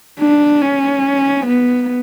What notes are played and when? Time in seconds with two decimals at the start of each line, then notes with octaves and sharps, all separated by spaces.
0.20 D4
0.62 C#4
1.46 B3